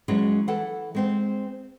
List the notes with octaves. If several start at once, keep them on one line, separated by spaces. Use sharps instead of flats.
E3 F#3 G#3 C#4
E3 A4 F#5
G#3 C4 C5